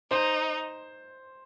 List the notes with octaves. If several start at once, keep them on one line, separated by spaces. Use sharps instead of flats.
D#4 C5